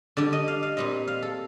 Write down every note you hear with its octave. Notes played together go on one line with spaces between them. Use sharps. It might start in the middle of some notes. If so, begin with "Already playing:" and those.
D3 G3 D4 D5
D#5
F5
F5
A#2 G3 C4 D#5
F5
A4